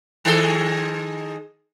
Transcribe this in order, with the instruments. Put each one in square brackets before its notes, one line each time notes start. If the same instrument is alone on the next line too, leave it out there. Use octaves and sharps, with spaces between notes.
[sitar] D#3 G#3 A4